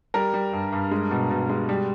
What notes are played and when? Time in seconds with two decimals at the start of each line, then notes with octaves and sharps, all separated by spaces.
0.14 G3 A#4
0.34 G3
0.53 G2
0.72 G2
0.91 G#3
1.11 B2
1.30 B2
1.49 G#3
1.69 G3